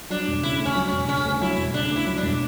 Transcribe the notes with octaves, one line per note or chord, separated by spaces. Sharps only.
F#3 D4
E1
C#3 E4
D2
C#4
F#3
E1 C#4
C#3 C#4
D2
F#3 E4
E1
C#3 D4
D2
E4
F#3
D4
E1